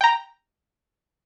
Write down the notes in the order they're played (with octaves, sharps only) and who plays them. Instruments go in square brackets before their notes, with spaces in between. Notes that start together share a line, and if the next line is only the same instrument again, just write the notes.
[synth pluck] G5 A#5